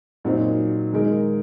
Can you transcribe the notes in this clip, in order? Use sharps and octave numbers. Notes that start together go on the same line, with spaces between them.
A#2 F#3 C4 D#4
D#3 G#3 D#4 A#4